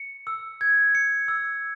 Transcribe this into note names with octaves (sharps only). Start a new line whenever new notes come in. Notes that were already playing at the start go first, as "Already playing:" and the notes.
Already playing: C#7
E6
G#6
C#7
E6